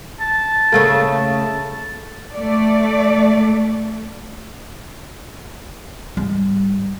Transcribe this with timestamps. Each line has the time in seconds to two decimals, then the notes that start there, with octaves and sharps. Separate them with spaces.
0.20 A5
0.72 C#3 A3 A#3
1.03 A5
2.35 A3 D5
6.17 G#2 G3